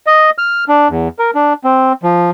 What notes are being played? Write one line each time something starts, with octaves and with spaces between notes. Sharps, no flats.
D#5
F6
D4
E2
A#4
D4
C4
F3